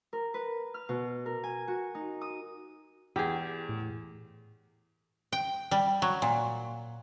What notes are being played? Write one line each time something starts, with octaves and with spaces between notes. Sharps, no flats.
A#4
B4
F6
B2
A#4
G#5
F#4
D#4
D#6
E2 G4 G#4
A2
G5
G3
F#3
A#2